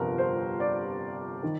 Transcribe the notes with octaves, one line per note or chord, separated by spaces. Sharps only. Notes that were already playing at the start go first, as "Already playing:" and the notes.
Already playing: G1 F2 C3 F3 A#4
C5
D5
D#3